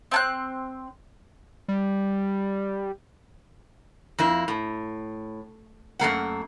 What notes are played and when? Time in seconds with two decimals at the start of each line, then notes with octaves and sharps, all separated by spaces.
0.11 C4 A5 F#6
1.68 G3
4.19 F2 A#3 E4
4.48 A2
5.99 F#2 A3 A#3 F#5